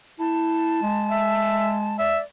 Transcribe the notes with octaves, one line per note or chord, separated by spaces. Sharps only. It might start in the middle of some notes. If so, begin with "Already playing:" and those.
E4 A5
G#3
E5
D5 E5